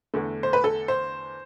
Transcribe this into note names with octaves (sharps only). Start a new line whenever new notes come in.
E2 D3 A3
C5
B4
A4
C5